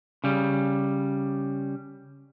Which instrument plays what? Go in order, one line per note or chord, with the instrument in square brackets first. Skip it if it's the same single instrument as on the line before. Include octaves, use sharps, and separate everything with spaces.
[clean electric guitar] C#3 G3